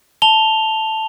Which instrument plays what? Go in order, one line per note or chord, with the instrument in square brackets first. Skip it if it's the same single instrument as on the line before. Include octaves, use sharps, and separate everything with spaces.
[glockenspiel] A5 F7 G7